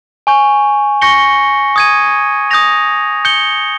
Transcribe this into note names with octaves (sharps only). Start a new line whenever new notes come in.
G#5 C#6 G6
C#6 G6 A#6 C#7 G7
D#6 G#6 D#7
D#6 G6 A#6 F7
G6 C#7 G7